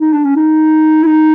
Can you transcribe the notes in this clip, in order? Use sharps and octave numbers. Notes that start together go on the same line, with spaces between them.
D#4
D4
C#4
D#4
E4
D#4